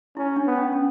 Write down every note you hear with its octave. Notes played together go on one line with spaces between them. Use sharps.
C#4 E4
D4
B3
C#4
C#4